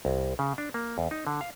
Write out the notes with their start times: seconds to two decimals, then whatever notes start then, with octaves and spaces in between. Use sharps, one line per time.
0.05 C2
0.39 C#3
0.58 D4
0.74 A#3
0.98 E2
1.11 D#4
1.27 D3
1.41 F5